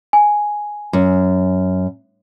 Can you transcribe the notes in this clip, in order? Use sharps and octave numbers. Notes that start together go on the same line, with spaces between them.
G#5
F#2